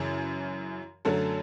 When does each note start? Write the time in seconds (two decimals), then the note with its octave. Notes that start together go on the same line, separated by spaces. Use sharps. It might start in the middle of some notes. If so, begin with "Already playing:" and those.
Already playing: F#2 C#3 E3
1.05 F#2 D3 F#3 A3 A4